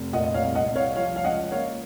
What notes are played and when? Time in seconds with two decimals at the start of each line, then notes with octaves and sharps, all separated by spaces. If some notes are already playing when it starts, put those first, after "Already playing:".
Already playing: F1
0.13 A#2 D#5 F#5
0.24 D#5
0.34 C#5 F5
0.41 C2
0.55 D#5 F#5
0.69 C2
0.75 C#5 F5
0.96 F3 C#5 F5
1.16 F5
1.24 C#2 D#5 F#5
1.52 A#3 C#5 F5